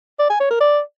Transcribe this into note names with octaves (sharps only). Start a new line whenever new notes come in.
D5
G#5
C#5
A#4
D5